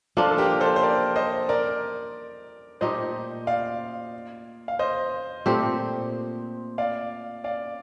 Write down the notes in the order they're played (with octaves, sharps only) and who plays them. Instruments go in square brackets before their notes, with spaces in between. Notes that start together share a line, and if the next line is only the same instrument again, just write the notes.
[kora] F3 A#3 D4 [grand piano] F4 A4
[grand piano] A4
G4 A#4
A4 C5
C5
A#4 D5
C5 D#5
A#4 D5
[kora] A#2 A3 D#4 G4 [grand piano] C5 D#5
[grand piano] D5 F5
F5
C5 D#5
[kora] A#2 A3 C4 G4
[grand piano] D5 F5
D5 F5